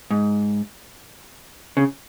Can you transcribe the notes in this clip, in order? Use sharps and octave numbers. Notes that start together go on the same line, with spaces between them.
G#2
C#3